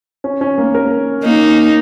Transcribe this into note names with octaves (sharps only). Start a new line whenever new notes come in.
C#4
C#4
A#3
A#4
A#3 D#4